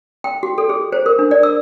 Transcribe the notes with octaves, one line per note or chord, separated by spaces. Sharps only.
G5
F#4
A4
G#4
C5
A#4
D4
D5
E6